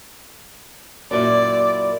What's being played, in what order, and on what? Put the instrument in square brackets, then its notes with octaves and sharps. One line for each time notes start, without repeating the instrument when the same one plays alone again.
[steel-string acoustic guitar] F#2 A#2 E4 [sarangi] D5